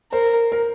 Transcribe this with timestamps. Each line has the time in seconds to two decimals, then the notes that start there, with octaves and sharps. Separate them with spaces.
0.12 A#4 C5
0.52 A#4